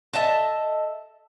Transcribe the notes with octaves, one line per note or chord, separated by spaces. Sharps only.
A4 D#5 E5 A5